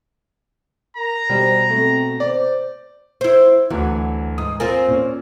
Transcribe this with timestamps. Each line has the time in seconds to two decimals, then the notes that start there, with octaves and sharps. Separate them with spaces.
0.97 A#4 A#5
1.29 B2 G3 C5
1.70 A3 C4
2.20 C5 D5
3.21 E4 C5
3.70 D2 E3 F#3
4.38 G#2 D#6
4.60 C4 F4 A#4 G#5
4.88 A#2 C#4